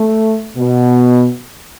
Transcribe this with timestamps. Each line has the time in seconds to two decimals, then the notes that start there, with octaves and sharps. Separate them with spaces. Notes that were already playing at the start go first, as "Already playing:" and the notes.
Already playing: A3
0.57 B2